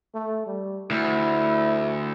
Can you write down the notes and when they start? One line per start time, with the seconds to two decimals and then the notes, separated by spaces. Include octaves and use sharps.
0.14 A3
0.46 G3
0.91 D2 E4